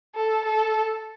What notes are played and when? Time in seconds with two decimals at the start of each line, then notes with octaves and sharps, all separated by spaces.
0.15 A4
0.45 A4